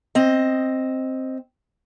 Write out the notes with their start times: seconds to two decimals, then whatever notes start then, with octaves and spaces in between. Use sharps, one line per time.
0.15 C4 D#5